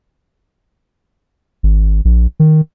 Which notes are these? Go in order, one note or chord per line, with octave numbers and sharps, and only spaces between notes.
G#1
A#1
D#3